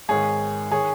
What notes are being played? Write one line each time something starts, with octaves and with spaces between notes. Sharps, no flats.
G#1 G#2 D#3 G#4 C#5
D#3 G#4 C#5